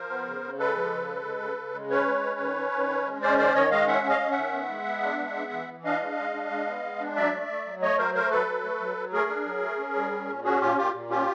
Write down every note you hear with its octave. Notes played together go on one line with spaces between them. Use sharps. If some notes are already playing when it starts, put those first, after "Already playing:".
Already playing: F3 A#4 C5
B3
C#3
C#3
G#3 A4 B4
F3
C#3
G#3
C#3
C#3
C#3
G#3
C#4 B4 C#5
G#3
C#4
D#3
C#4
D#3
C#4
G#3
C#4 C5 D5
D#3 C5 D5
D#3 C#5 D#5
G#3 D#5 F5
C#4 E5 F#5
C#4
D#5 F5
C#4
E5 F#5
D#3
B3
G#3
B3
D4
G#3
B3
E3
E3
D4 D#5 F5
G#3
G#3
D4
G#3
B3
G#3
D4
F#3 D5 E5
A3
A3
F#3
A3 C#5 D#5
F#3 A#4 C5
A3 A#4 C5
F#3 A4 B4
F#3
A3
F#3
F#3
A3 G#4 A#4
D4
F#3
A3
C#4
G3
C#4
A#2
C#4 F#4 G#4
A#2 F4 G4
A#2 F4 G4
A#2
C#4 F4 G4